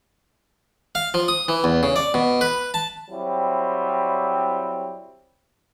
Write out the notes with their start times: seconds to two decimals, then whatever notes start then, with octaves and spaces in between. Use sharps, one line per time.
0.95 F5
1.14 F3
1.28 D#6
1.48 E3
1.64 E2
1.83 C#3
1.96 D5
2.14 B2
2.41 B4
2.74 A5
3.10 F#3 G3 C4 E4